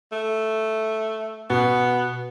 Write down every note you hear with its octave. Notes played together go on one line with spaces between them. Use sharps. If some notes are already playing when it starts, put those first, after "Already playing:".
A3
B2 B3